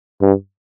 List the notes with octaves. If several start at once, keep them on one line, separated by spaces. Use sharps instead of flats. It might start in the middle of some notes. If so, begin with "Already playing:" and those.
G2